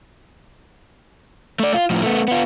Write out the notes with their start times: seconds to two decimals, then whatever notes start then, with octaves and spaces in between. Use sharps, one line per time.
1.60 A3 D5
1.74 F4
1.90 A2 F3
2.02 A3 B3
2.28 B3 F4